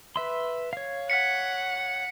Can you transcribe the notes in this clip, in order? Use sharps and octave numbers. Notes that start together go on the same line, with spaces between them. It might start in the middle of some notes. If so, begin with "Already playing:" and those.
B4 E5 C6
C#5 F5
F#5 B6 C#7